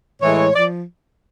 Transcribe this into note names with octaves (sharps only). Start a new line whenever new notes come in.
A2 E3 G#3 C#5
F3 D5